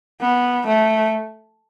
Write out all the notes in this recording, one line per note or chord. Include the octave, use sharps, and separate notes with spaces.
B3
A3